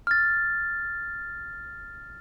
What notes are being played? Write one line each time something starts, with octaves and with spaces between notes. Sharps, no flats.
F6 A6